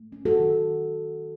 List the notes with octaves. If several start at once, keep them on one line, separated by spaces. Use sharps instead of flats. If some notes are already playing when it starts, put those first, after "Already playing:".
Already playing: A3
C#4
F#4 A4
D#3